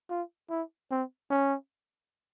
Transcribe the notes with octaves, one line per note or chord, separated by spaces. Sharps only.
F4
E4
C4
C#4